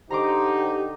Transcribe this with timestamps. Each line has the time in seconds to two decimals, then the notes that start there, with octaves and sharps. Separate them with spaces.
0.10 D3 D#4 G4 C5 A#5 C6 D6